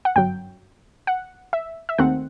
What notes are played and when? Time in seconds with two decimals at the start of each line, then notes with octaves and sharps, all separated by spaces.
0.05 F#5
0.16 G1 F#2 F#3 G5
1.07 F#5
1.53 E5
1.89 E5
1.98 D#2 D#3 A3 C4 F#5